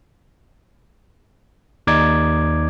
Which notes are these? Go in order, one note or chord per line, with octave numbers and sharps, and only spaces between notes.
D#2 D#4 D5 D6 G#6